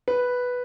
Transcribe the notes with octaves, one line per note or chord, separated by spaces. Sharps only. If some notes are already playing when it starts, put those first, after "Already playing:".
B4